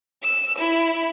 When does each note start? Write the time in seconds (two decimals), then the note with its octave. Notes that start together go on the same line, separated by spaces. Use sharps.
0.23 E6
0.58 E4